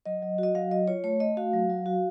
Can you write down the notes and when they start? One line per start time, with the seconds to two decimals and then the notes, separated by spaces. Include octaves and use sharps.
0.06 F#3 D#5
0.22 F#3
0.38 F#4 D#5
0.55 F#3 F5
0.71 F#3 D#5
0.88 F4 C#5
1.04 A3 C#5
1.20 A3 D#5
1.37 F#4 F5
1.53 F#3
1.70 F#3
1.86 F#4